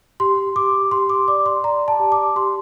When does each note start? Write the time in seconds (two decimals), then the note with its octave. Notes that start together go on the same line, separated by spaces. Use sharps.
0.20 G4 C6
0.56 G4 D6
0.91 G4 C6
1.10 D6
1.28 D5 D6
1.46 C6
1.64 D5 A#5
1.88 A5
2.00 G4
2.12 D6
2.36 G4 C6